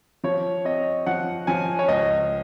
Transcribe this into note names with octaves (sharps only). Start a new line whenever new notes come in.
F3 C#5
C4 D#5
F3 F#5
F3 G#5
C#5
C#2 D#5